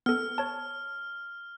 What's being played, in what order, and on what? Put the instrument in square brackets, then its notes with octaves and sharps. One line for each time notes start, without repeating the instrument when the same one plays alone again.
[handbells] B3 A4 [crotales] F6
[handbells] C#5 A5